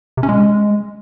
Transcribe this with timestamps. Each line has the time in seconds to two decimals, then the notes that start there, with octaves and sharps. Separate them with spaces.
0.17 C3
0.23 C#4
0.29 G#3